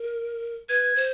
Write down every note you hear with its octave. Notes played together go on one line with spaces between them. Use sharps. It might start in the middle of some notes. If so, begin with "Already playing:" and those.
Already playing: A#4
B4 G#6
C5